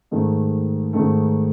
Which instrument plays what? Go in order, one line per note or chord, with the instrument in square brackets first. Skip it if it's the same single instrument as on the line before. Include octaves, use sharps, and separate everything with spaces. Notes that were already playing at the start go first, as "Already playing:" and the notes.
[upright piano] G#2 D#3 A3
G#2 D#3 A3